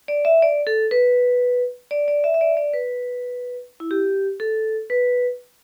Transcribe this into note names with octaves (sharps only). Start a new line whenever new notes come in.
D5
E5
D5
A4
B4
D5
D5
E5
E5
D5
D5
B4
E4
G4
A4
B4